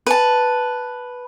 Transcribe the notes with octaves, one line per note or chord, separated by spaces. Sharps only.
B4 A5